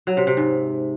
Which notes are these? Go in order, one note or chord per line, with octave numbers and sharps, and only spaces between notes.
F#3
C3
C3
G#2